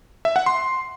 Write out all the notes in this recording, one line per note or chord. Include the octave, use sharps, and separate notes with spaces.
E5
F#5
C6